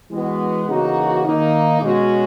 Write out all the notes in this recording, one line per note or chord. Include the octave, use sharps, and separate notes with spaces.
E3 G#3 B3 F#4
C#3 E3 A#3 D#4 F#4
D#3 A#3 D#4
B2 G#3 C#4 F#4